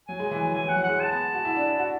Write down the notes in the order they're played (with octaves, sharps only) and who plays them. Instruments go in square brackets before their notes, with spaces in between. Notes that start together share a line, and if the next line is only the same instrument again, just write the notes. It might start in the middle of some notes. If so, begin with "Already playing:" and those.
[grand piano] F#3 [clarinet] G#5
[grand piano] G#3
E3
F#3
[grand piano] E3 [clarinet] G#5
[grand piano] F#3
[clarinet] F#5
[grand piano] F#3
[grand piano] G#3 [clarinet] F#5
[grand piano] G#3 [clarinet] A5
[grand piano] B3
F#4
E4
D4
E4
F#4